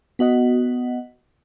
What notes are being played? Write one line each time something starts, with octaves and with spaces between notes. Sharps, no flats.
B3 F#4 D#5 F#5